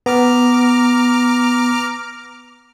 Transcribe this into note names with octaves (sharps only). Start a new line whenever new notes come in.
B3 A#5 D6 F6